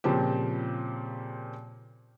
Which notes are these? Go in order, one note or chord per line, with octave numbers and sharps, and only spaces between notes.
A#2 C#3 F3 C4 G4